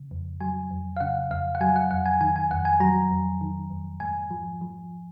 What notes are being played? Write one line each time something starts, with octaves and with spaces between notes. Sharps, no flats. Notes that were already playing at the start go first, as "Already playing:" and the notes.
Already playing: C#3
F2
F#3 G#5
F2
F5
C#3 F#5
F2 F5
F#5
F#3 G#5
F#5
F2 F#5
G#5
D#3 G#5
G#5
F2 F#5
G#5
F#3 A#5
F2
D#3
F2
G#2 G#5
F3
F3